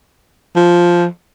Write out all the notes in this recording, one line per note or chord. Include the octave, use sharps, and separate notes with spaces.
F3